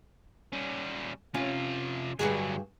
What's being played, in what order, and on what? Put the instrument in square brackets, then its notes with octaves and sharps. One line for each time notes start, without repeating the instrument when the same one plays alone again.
[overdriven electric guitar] G3 C#4
[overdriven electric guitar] C3 F4 [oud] C#4
[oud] G2 F#4 G#4 [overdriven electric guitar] D3 F#3